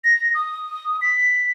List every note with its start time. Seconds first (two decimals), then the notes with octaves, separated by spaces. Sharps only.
0.04 A#6
0.35 D#6
1.02 B6